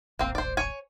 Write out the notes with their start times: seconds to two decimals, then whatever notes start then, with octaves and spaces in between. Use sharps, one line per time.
0.19 D#1 A1 A#3 C4
0.35 C5 D5
0.57 C#5 G#5